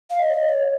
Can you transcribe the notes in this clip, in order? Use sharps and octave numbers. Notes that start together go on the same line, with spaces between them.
F5
D#5
C#5
D#5
C#5